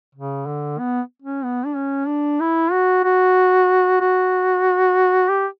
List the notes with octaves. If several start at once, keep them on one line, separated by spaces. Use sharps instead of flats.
C#3
D3
B3
C#4
B3
D4
C#4
D4
E4
F#4
F#4
F#4
G4